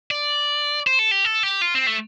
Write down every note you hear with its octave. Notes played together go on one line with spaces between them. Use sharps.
D5
C5
A4
G4
A4
G4
F4
C4
A3